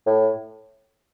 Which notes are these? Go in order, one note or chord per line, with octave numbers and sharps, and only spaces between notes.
A2